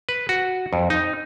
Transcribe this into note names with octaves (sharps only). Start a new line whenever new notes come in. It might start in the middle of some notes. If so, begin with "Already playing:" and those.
B4
F#4
F2
D#4